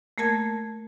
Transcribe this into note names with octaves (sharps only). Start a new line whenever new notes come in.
A3 A#3 A#4 A5 G#6